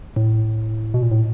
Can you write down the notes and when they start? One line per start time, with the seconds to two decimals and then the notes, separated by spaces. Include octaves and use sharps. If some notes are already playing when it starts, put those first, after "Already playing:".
0.16 A2
0.94 B2
1.03 A#2
1.11 A2